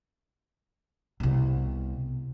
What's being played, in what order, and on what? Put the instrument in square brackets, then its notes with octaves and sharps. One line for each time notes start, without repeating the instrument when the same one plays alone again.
[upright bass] C2 B2